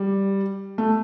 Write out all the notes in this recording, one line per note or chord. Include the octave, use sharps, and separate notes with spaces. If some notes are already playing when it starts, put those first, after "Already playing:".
Already playing: G3
A3